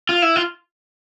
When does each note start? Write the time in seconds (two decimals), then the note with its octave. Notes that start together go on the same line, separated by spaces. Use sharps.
0.09 F4
0.22 E4
0.36 F4